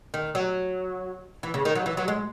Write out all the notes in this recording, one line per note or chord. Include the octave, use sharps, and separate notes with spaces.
D#3
F#3
E3
C#3
D#3
F#3
E3
F#3
G#3